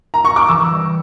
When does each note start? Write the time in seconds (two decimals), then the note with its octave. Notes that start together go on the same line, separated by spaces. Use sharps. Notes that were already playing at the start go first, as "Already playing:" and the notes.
0.14 A#5
0.25 C#6
0.36 D6
0.48 E3 E6
0.71 G3